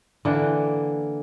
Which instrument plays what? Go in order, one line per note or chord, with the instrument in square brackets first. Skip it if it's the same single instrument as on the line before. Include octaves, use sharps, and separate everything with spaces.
[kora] D3 E3 A#3